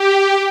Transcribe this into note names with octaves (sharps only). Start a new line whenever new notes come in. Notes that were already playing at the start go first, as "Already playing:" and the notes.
Already playing: G4